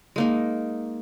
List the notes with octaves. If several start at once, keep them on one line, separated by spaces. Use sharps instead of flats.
G#3 A#3 D#4